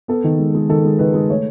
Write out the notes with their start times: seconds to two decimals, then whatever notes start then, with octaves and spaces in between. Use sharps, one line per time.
0.08 B3 A4
0.24 D#3
0.39 G#3
0.55 G#3
0.69 D#3 A4
0.85 G#3
0.99 D#3 B4
1.14 G#3
1.30 A3 C#5